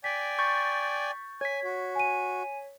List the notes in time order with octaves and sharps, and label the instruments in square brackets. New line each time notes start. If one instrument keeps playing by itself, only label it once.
[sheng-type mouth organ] D5 G5 G#5 [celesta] B6
[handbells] C#6 G6 A6
[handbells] C#5 B6 [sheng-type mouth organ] G#5
[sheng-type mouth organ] F#4
[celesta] G#5 D#7